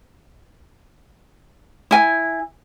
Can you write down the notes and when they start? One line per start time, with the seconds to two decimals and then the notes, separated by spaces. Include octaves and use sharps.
1.91 E4 G#5